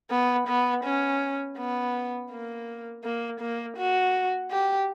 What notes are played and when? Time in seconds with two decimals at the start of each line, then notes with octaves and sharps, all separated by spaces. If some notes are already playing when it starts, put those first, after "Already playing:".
0.10 B3
0.48 B3
0.84 C#4
1.57 B3
2.31 A#3
3.04 A#3
3.40 A#3
3.76 F#4
4.50 G4